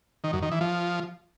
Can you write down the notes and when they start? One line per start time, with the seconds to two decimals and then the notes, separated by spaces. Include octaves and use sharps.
0.24 D#3
0.33 F#2
0.42 D#3
0.52 E3
0.61 F3